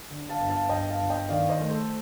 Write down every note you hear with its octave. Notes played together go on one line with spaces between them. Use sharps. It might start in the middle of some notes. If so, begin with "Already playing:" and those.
D3
F5 A5
G1
F5 A5
G1 D#5 G5
F5 A5
G1
D#5 G5
D#3 D5 F5
C5 D#5
A3
A4 C5